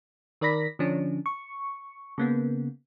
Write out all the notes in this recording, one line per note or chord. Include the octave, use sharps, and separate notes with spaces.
D#3 A#4 D5 B5 A#6 B6
D3 F3 C#4 D4
C#6
C#3 A#3 B3